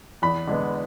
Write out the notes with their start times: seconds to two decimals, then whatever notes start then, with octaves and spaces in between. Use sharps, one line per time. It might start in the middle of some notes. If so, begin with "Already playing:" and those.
0.22 E2 B5
0.47 D3 G#3 B3